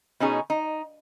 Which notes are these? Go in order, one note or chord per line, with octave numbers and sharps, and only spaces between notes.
B2 C#4 D#4 G#4
D#4